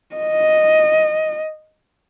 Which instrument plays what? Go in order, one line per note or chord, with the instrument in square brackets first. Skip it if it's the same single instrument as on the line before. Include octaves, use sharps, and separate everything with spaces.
[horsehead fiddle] D#5